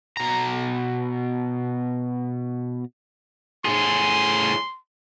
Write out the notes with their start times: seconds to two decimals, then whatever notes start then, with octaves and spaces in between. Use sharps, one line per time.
0.17 B2 A#5
3.65 A2 G#4 C6